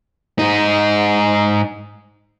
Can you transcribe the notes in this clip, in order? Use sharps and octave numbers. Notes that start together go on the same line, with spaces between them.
G#2 D#4